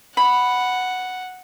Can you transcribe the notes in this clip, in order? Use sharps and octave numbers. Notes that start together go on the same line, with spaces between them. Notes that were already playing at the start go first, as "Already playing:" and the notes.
F#5 B5